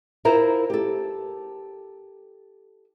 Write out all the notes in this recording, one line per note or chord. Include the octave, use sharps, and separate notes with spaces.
E4 F4 A#4 C5 E5
G4 A4